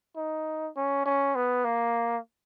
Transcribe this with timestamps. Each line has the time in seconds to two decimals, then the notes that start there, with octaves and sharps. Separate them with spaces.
0.16 D#4
0.76 C#4
1.06 C#4
1.35 B3
1.64 A#3